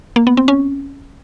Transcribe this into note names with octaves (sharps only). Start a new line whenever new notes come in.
A#3
B3
C4
C#4